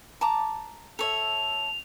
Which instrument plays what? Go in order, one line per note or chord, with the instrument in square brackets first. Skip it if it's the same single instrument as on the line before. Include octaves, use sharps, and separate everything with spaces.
[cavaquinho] A5 A#5 D6
[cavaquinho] A4 C#5 E5 [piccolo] F7